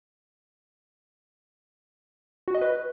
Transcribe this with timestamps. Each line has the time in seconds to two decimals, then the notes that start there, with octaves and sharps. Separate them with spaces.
2.48 F#4
2.55 D#5
2.61 B4